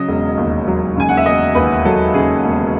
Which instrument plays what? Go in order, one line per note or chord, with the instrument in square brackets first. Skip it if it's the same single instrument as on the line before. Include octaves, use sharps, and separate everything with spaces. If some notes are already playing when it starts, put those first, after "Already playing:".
Already playing: [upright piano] C#3 F#3 D#5
E1
D#2
F#3
C#3 G#5
F#5
E5
E1 D#5
D#2 B4
F#3 A4
C#3 G#4
E1